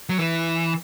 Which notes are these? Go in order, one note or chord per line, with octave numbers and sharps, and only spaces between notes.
F#3
E3